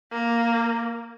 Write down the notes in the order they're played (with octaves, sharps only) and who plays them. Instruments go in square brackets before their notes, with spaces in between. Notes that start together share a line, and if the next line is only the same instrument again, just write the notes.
[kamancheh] A#3